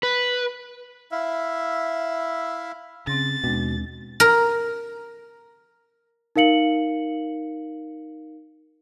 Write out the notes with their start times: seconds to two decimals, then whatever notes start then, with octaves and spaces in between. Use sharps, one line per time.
0.03 B4
1.12 E4 E5 F5
3.07 C#3 C4 C6 A6 A#6
3.44 D#2 B2 G#3 D4
4.20 A#4
6.36 D#4 A#4 F5 C#7 F#7